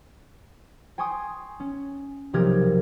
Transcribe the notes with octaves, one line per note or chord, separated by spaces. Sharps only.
G5 G#5 C6 C#6 D#6
C#4
B1 C3 F3 G4 A#4 G#6